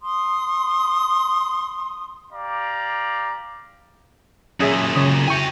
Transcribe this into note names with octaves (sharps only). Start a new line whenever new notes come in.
C6 D#6
G4 D5 F5 A#5
F#2 A#2 C#4 G#4 E5 D#6
C#3 C#5 D#6
E4 F#4 G5 G#5 C#6